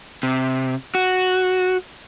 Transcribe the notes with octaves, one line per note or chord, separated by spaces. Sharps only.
C3
F#4